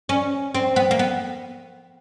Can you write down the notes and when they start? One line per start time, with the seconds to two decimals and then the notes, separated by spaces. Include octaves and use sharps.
0.09 C#4
0.55 C4
0.76 B3
0.91 A#3
0.99 B3